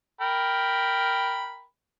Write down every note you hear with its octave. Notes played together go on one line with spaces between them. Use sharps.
A#4 G5 B5